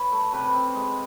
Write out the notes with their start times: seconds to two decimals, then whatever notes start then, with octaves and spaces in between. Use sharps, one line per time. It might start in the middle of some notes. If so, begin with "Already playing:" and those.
Already playing: B4 C#5
0.12 A3
0.33 C3 B4
0.54 C3
0.75 G#3